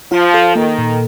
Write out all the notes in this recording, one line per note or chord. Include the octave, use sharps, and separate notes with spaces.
F3 F4
A4
D#3 A#3
A#2